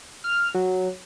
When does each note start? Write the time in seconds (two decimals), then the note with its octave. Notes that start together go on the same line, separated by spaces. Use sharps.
0.24 F6
0.54 F#3